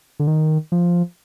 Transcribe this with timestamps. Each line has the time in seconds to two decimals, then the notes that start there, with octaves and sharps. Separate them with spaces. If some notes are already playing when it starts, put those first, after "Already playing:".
0.20 D3
0.27 D#3
0.72 F3